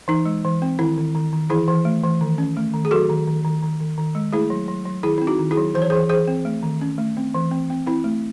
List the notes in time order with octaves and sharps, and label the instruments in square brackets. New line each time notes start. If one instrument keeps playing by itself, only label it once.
[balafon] E3 D#4
G#3
E3
C4
D#3 E4
D#3
D#3
D#3
E3 E4 G#4
E3
A3
E3
D#3
C#4
A3
D#3
G#4
F#3 F#4 A4
D#3
D#3
D#3
D#3
D#3
D#3
G#3
A3 E4 G#4
F#3
F#3
F#3
D#3 E4 G#4
C4 E4
D#4 F#4
D#3
E4 G#4
F#3
E3 C5
C#5
E3 G#4 C5
E3 G#4 C5
C4
A3
D#3
C#4
A3
C4
E3
C4
C4
C4 E4
A3